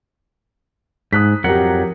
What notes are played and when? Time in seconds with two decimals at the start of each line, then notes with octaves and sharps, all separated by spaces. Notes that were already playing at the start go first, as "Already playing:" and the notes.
1.13 G#2 D#6 F#6 B6
1.44 F2 F#3 G4 A#4 F#5